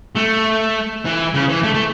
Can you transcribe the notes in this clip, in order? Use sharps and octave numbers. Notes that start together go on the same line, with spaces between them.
A3
E3
C#3
E3
A3
A3